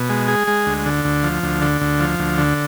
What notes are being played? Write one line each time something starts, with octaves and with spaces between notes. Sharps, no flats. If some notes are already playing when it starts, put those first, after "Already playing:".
Already playing: B2
G#3
G#4
G#3
D2
D3
D2
F3
D2
D3
D2
F3
D2
D3